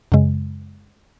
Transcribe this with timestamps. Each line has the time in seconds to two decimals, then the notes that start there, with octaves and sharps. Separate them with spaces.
0.12 F#2 C#3 G#3